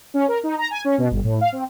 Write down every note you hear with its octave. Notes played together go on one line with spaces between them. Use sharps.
C#4
A#4
D#4
A#5
G#5
C#4
B2
G1
A2
F5
C4